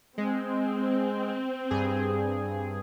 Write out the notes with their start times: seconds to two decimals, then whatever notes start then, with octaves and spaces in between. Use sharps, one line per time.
0.18 G#3 C4
1.71 G2 G#4